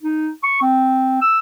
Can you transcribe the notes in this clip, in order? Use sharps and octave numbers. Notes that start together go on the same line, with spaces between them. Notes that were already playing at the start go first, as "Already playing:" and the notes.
D#4
C#6
C4
E6